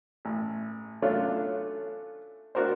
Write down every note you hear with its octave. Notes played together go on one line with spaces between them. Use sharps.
A1
F#3 A3 C#4 D4 F4
D4 F#4 A#4 C5